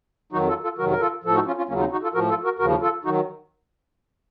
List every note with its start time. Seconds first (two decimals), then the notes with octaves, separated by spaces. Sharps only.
0.32 F2 D#3 F#3 D#4 F#4
0.49 F4 A4
0.63 F4 A4
0.78 F2 C3 D#3 F#3 F#4 A#4
0.91 A#4
1.00 F4 A4
1.24 A2 F3 A4
1.35 D#4 F#4
1.47 C#4 F4
1.57 C#4 F4
1.68 D#2 C#3 F#3 A#3 C#4
1.76 F4
1.79 C4 D#4
1.92 D#4 F#4
2.03 F4 A4
2.14 A2 F3 F#4 A#4
2.29 F4 A4
2.44 F#4 A#4
2.59 D#2 C#3 F3 F#4 A#4
2.81 F4 A4
3.04 D#3 F#3 D#4 F#4